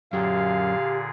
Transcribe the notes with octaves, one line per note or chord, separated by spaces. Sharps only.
F#2 A#2 D3 G4 G#4 F5